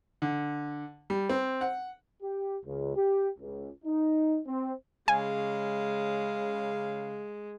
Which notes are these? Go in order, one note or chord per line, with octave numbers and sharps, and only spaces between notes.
D3
G3
C4
F#5
G4
C#2
G4
C#2
D#4
C4
C#3 G#3 F5 G#5